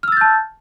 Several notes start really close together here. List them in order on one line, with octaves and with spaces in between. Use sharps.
F6 E6 A6 G6 A5